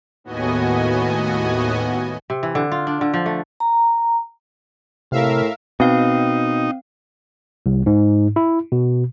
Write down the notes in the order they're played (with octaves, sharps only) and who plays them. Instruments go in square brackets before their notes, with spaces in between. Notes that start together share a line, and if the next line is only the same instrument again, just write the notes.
[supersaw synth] D#2 A2 B3 F#4 D#5 G#5
[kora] C3
E3
D3
F4
D4
D3
F3
A3
[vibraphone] A#5
[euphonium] A2 [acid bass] C3 [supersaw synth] A#4 E5 F5
[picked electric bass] B2 [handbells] C4 F5 [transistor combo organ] D#4
[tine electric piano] C2
G#2
E4
B2